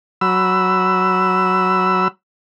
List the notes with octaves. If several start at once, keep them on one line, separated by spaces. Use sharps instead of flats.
F#3 B5 E6